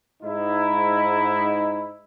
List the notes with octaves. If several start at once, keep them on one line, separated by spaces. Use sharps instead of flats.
G#2 D#4 E4